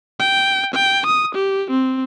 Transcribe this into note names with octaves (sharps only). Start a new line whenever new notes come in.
G5
G5
D#6
G4
C4